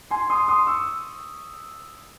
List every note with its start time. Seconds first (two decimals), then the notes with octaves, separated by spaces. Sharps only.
0.11 G#5 C6
0.30 C6 D#6
0.48 C6 D#6
0.67 C#6 E6